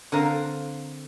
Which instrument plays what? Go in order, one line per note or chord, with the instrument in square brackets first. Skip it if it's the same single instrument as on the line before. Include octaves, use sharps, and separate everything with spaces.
[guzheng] D3 C4 A#4 F5